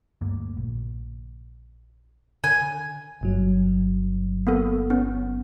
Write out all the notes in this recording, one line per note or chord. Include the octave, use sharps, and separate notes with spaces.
D2 G2 A#3
A#1
D3 G#5
G1 G2 F#3
A#3 B3 A4
B3 C#4